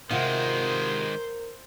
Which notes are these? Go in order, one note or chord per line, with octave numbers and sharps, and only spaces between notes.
C3 D#3 G#3 F4 F#4 A#4 C5